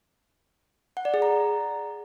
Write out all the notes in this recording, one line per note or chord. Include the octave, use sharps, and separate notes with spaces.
F#5
D5
G#4
A#5